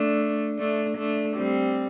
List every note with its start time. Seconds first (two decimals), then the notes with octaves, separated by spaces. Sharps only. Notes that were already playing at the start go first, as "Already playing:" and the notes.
Already playing: A3 D4
0.59 A3 D4
0.98 A3 D4
1.37 G3 C4